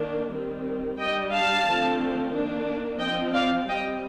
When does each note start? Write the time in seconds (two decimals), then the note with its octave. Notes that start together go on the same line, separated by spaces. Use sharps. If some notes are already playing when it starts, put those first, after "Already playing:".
Already playing: D#3 A#3 D4
0.31 D#3 G3 C4
0.98 G3 D4 D#5 G5
1.32 F5 A5
1.66 D3 F3 A3 C4
2.33 D#3 A#3 D4
3.00 F3 C4 D#5 G5
3.34 D5 F5
3.68 G3 C4 D#5 G5